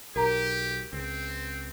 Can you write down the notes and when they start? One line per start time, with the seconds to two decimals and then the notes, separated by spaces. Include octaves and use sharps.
0.16 B1 G4 A#4 A#5
0.93 C#2 C4